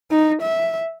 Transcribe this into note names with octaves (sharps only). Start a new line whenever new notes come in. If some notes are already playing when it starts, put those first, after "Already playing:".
D#4
E5